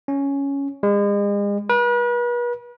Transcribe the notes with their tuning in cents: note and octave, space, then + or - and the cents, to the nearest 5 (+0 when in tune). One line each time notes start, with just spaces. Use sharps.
C#4 +5
G#3 -40
B4 -40